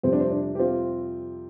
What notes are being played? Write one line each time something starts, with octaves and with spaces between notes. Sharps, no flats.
F2 C3 G3 C4
D4
C4
D4
G4
C4 F4